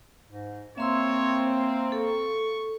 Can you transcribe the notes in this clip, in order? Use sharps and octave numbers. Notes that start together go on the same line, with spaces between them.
G#2
A#3 C4 C#5 E5 C6 E6
A4 C#6